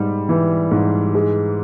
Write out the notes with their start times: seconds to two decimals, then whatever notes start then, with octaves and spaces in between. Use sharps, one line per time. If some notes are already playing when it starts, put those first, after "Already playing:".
Already playing: G#2 G3
0.29 E3
0.71 G#2
1.14 G#3